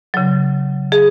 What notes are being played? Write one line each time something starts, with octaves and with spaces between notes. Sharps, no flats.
C#3 F#3
G#4